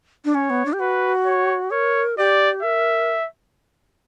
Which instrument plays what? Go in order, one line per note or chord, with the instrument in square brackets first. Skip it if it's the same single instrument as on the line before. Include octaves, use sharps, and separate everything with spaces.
[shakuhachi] D4
[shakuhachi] C#4 [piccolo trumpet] C#5
[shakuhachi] B3
D4
G4
[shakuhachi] F#4 [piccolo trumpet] B4
[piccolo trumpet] C#5
[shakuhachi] A#4 [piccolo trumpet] C#5
[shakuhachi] G4 [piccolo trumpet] D5
[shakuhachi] A#4 [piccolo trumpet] E5